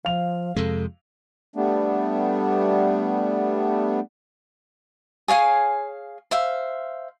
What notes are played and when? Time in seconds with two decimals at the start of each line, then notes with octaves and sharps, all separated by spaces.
0.05 F3 F5 F7
0.56 F2 C3 G#3 A4
1.56 G3 A3 B3 D4
5.28 G#4 C#5 F5 G#5
6.31 C5 E5 F5